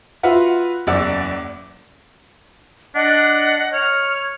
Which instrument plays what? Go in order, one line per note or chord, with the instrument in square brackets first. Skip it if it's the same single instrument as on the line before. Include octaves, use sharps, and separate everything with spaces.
[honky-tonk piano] F4 F#4 B4 E5 F#5
F#1 E2 D5 F#5 E6
[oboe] D4 [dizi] D#5 [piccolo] F#5
[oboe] C#5 [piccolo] F6